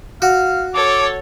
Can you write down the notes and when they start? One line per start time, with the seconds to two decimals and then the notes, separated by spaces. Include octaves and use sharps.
0.22 F#4 F5
0.74 A4 C#5 D6